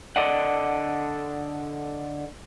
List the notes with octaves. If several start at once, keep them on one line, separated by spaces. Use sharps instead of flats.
D3 A4 D5 D#5 F#5